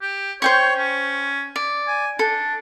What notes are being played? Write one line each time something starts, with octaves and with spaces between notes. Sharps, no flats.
G4
C5 C#5 G5 C#6
C#4
D5
G#5
D4 A4